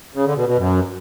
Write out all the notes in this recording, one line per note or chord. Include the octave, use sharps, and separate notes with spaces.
C#3
D3
B2
B2
F#2